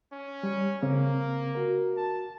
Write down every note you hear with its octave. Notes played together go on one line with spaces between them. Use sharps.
C#4
G3
C#3 A#3 C4
F#4 A#4
A5